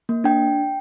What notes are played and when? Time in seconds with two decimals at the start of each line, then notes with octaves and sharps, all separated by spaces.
0.09 A#3
0.24 D4 G5